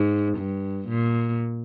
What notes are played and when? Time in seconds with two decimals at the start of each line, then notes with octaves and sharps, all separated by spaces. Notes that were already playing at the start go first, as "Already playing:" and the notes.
Already playing: G#2
0.38 G2
0.88 A#2